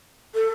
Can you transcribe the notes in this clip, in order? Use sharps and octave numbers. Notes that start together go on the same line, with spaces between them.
A4